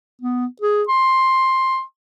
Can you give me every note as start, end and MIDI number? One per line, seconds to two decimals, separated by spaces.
0.22 0.46 59
0.62 0.83 68
0.89 1.82 84